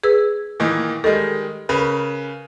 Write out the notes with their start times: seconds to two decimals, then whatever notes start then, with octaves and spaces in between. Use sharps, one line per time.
0.04 G#4 B4 E6
0.60 A#2 D#3 E3
1.04 D#3 G3 G#3 A4
1.69 C#3 A#4 B4